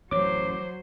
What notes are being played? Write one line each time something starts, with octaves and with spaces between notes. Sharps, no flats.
A1 F#2 F#3 C5 C#5 D6